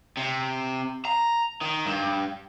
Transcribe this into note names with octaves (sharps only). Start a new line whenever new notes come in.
C3
A#5
D#3
G2